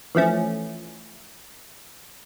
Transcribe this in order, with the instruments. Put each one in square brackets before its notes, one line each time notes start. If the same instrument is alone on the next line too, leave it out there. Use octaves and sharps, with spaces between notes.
[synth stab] E3 F3 A3 C#4